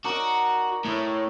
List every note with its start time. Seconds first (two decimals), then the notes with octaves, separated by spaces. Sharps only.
0.04 D#4 F#4 A#4 D5
0.85 A2 E4 C#5 D#6